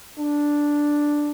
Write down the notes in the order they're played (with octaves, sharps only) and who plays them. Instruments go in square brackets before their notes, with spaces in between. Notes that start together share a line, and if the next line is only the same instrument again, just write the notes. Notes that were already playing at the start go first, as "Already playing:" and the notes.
[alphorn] D4